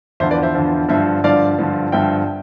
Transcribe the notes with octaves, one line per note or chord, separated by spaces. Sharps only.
E2 D3 F3 C5 E5
B4 D5
C5 E5
E2 D3 F3
G2 D3 F3 C5 E5
G2 D3 F3 D5 F5
G2 D3 F3
G2 D3 F3 E5 G5